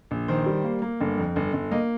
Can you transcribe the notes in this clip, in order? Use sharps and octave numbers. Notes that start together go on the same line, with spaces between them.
A#1
D#3 C5
G3
A#3
A#3
G1
F2
G1
G1
A#3 D#5